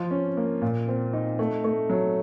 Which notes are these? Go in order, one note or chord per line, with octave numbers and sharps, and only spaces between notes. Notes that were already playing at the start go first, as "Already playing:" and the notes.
Already playing: F3 F4
C#4
A#3
A#2
C4
D#4
A3
A3
F#3